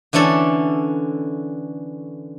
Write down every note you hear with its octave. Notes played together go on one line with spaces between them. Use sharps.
D3 E3 C#4 D4 A4 E5